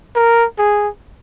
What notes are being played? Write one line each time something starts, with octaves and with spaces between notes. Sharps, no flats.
A#4
G#4